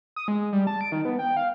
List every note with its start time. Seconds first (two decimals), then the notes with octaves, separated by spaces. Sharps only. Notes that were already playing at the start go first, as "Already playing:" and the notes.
0.16 D#6
0.28 G#3
0.53 G3
0.67 A5
0.81 D7
0.92 D#3
1.05 B3
1.19 G5
1.37 F5